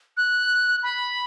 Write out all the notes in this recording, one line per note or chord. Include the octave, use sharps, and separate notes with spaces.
F#6
B5